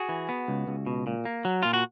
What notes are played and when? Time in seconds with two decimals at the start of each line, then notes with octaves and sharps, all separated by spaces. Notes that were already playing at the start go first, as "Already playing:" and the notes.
Already playing: F#4 G#4
0.09 E3
0.29 B3
0.48 C#2
0.67 C#2
0.86 B2
1.07 A#2
1.25 A#3
1.45 F#3
1.63 A#2 F4
1.74 F#4